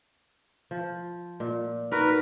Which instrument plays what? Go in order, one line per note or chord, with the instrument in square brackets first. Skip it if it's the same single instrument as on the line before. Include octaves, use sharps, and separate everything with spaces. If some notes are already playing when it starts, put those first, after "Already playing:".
[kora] F3
A#2
[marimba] D#4 [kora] F#4 [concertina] A#4 B4